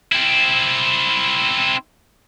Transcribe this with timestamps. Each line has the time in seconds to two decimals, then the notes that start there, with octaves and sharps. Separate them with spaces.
0.12 C4 E4